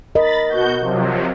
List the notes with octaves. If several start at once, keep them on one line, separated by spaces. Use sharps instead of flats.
A#4 D#5 B5 A6
B2 F#4 G6
C3 F3 F#3